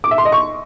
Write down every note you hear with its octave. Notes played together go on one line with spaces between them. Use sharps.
D6
E5
C6
D#5
C#6